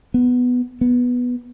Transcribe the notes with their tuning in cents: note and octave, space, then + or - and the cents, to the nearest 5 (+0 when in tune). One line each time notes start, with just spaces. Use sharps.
B3 +5
B3 -5